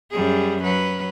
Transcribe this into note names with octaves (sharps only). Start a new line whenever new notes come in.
F#2 G3 G#4
F#3 B4